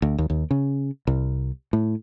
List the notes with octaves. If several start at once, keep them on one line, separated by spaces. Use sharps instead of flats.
D2
D#2
D#2
C#3
C2
A2